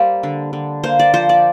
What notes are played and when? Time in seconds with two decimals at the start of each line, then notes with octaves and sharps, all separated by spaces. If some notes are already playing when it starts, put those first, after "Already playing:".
Already playing: G3 A#3 C5
0.23 D3
0.53 D3
0.83 A#3 C5
0.99 D5
1.14 F3 C5
1.29 D5